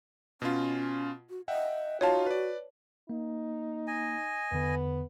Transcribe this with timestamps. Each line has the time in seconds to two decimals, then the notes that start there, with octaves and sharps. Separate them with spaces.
0.42 B2 C#4 F4
1.30 F#4
1.48 D#5 E5 F#5 G5
2.01 D#4 F4 F#4 C#5 F5 A5
2.26 B4 D5
3.10 A#3 D#4
3.87 D#5 G#5
4.52 E2 D3 B3